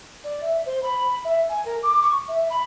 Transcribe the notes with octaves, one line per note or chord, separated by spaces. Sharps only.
D5
E5
C5
B5
E5
G#5
A#4
D6
C#6
E5
B5